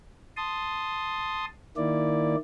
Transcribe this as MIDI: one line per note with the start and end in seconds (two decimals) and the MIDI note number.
0.37 1.45 81
0.37 1.45 84
0.37 1.45 87
1.77 2.36 51
1.77 2.36 58
1.77 2.36 64
1.77 2.36 74